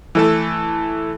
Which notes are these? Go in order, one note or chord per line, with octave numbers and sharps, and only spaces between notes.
E3 A3 A4